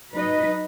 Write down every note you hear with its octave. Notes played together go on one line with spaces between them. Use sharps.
F#3 D#4 B4 D#5